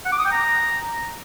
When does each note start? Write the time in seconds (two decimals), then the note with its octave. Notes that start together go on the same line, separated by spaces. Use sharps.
0.05 F#5
0.12 D6
0.19 D#6
0.25 G5
0.32 A#5